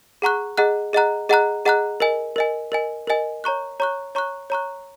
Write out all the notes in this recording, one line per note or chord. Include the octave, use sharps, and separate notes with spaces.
G#4 F#5 A#5 C#6 F#6
G#4 D#5 F#5 A#5 F#6
G#4 D#5 F#5 A#5 F#6
G#4 D#5 F#5 A#5 F#6
G#4 D#5 F#5 A#5 F#6
A#4 D#5 G#5
A#4 D#5 G#5
A#4 D#5 G#5
A#4 D#5 G#5
C#5 A#5 C#6 F#6
C#5 A#5 C#6 F#6
C#5 A#5 C#6 F#6
C#5 A#5 C#6 F#6